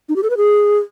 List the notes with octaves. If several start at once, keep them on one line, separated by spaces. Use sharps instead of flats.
D#4
G4
A4
B4
G#4